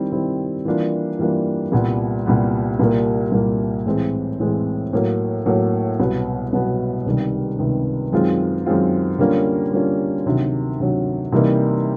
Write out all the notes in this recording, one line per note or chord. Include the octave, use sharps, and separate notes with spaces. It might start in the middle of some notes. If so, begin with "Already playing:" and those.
Already playing: D#3 G3 C4 E4
D#3 G3 C4 E4
E3 G3 A#3 D4 F4
E3 G3 A#3 D4 F4
C2 A#2 G3 B3
C2 A#2 G3 B3
C2 A#2 G3 A#3
C2 A#2 G3 A#3
A2 E3 G#3 C4
A2 E3 G#3 C4
A2 F#3 A#3
A2 F#3 A#3
C2 B2 F#3 B3
C2 B2 F#3 B3
C#2 C3 D#3 G3
C#2 C3 D#3 G3
F#2 D#3 G#3 C4 F4
F#2 D#3 G#3 C4 F4
D3 G3 A#3 C#4 F4
D3 G3 A#3 C#4 F4
D2 C3 D#3 F#3
D2 C3 D#3 F#3
C3 E3 G3 A#3 D#4